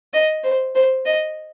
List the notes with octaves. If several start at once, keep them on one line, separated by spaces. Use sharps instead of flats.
D#5
C5
C5
D#5